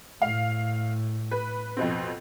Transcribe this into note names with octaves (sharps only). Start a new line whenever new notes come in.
A2 F5
B4
F2 B2 C4